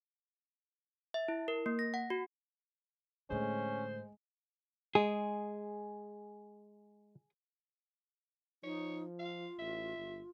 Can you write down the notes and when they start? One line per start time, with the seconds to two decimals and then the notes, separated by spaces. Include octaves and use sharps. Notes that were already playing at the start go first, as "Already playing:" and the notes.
1.14 E5
1.28 E4
1.48 A#4
1.66 A#3
1.79 A#6
1.94 F#5
2.10 F#4
3.30 A2 D3 G#3 C#4 C5
4.95 G#3 G#4
8.64 F3 D#4 C#5
9.19 F4 F5
9.59 A1 E5
9.97 G1